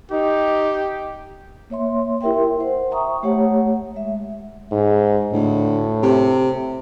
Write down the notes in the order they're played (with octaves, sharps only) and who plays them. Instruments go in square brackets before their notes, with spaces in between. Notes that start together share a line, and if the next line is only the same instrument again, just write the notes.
[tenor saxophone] D#4 [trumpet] G4
[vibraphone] A#3 C#5 E5 C6
E4 G4 A#4 E5 G5 C6
C5 F#5
E5 G5 A#5 C#6 D#6
A3 G4 C#5 F#5
G#3 E5
[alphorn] G#2
[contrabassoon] D2 [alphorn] A2
[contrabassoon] C3